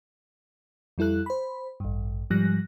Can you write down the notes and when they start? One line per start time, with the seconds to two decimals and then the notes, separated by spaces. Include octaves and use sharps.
0.98 F2 G3 E4 A4 F#6
1.26 C5 B5
1.80 A1 G2
2.30 G#2 F3 G3 F#6 A#6